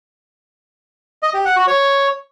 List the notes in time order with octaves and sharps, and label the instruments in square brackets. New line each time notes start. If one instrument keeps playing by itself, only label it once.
[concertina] D#5
G4
F#5
F#4
C#5